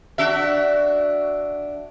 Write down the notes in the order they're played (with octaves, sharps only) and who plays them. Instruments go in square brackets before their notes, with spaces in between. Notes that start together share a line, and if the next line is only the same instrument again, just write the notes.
[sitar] D4 F#4 E5